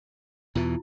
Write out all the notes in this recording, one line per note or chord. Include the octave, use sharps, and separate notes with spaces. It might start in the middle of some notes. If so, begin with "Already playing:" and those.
E2 B2 E3 E4 F4